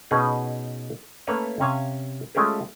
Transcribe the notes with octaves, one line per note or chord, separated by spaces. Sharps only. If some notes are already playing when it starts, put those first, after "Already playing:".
B2 B3 C#4 D#4 G#4 B4
A3 A#3 C#4 B4 C#5
C3 C#4 F5 G#5
G#3 A3 C#4 F4 G4 G#4